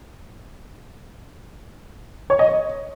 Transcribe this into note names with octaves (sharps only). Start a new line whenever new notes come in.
C#5
D#5
C#5